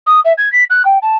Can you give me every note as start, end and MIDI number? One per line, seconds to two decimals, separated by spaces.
0.06 0.20 87
0.25 0.33 76
0.38 0.51 92
0.52 0.64 95
0.70 0.83 90
0.85 0.98 79
1.02 1.17 81